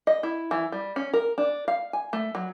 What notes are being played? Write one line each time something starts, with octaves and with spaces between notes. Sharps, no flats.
D#5
E4
E3
G3
C#4
A#4
D4
F5
G#5
A3
F#3